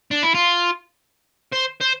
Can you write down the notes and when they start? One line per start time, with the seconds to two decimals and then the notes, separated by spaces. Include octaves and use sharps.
0.11 D4
0.23 E4
0.34 F4
1.52 C5
1.80 C5